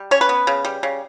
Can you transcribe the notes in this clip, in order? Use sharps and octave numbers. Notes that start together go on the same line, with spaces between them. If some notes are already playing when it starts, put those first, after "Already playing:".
Already playing: G3
C#4 C#5
B4
B3
C#3
G3
C#3